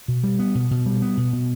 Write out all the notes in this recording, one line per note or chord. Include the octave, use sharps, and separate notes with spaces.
B2
G3
B3
B2
B2
G3
B3
B2
B2